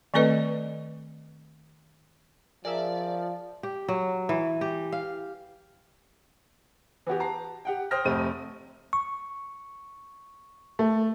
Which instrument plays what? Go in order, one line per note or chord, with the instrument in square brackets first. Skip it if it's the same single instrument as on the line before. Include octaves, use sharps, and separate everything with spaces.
[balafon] D#3 A3 C4 A4 B4 D#5
[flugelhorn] F3 [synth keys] G#4 A#4 E5 [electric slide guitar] D5
[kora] G4
F#3
E3
G4
F5
[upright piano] E3 B3 F#4 G4
A5 A#5 C7
G4 F#5 G5
C5 G5 D#6 F6 A#6
F1 F2 C3 A3 D#7
[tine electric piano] C#6
[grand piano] A3